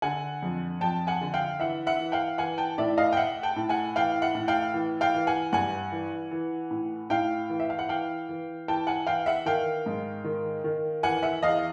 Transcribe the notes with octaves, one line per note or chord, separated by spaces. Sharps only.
D3 F#5 G#5
F2
F2 G5 A5
F#5 G#5
D3
F5 G5
E3 E5 F#5
E5 F#5
E3
F5 G5
E3 F#5 G#5
G5 A5
A2 D5 E5
D#5 F5
G5
A2 E5 F#5
G5 A5
A2
F#5 G#5
E3 F5 G5
E5 F#5
A2
F5 G5
E3
F5 G5
E3
F#5 G#5
G2 F#5 G#5
E3
E3
A2
A2 F5 G5
E3
E5
F5
F#5
E3 F5 G5
E3
E3 G5 A5
F#5 G#5
E3 F5 G5
E5 F#5
D#3 F5 G5
G#2
D#3
D#3
E3 F#5 G#5
E5 F#5
E2 D#5 F5